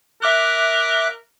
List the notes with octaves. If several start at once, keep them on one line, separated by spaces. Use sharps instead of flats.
A#4 E5 D6 F#6